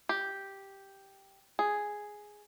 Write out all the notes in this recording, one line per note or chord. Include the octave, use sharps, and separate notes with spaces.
G4
G#4